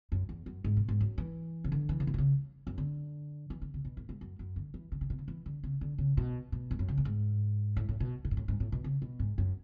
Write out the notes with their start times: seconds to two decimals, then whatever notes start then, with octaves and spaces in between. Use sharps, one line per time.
0.12 F#2
0.29 E2
0.46 F#2
0.64 G#2
0.77 B2
0.88 G#2
1.00 F#2
1.18 E3
1.64 C#3
1.72 D3
1.89 E3
2.00 C#3
2.07 D3
2.14 B2
2.18 C#3
2.67 F#2
2.78 D3
3.50 E3
3.62 D3
3.74 C#3
3.85 B2
3.97 A2
4.09 G#2
4.21 F#2
4.39 F#2
4.56 D3
4.74 E3
4.92 D3
5.01 C#3
5.10 B2
5.19 C#3
5.28 E3
5.46 D3
5.64 C#3
5.81 D3
5.98 C#3
6.17 B2
6.52 B2
6.71 G#2
6.79 F#2
6.88 C#3
6.97 A2
7.05 G#2
7.77 A2
7.89 A2
8.00 B2
8.25 B2
8.31 G#2
8.37 A2
8.48 G#2
8.60 A2
8.72 B2
8.84 C#3
9.02 B2
9.19 G#2
9.38 F#2